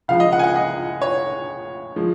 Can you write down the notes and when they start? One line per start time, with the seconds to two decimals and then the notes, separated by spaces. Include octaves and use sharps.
0.08 C#2 C#3 F3 F5
0.20 D#5
0.32 F#5
0.39 G#5
0.44 F#5
0.56 D#5
1.02 C#5
1.96 F3 G#3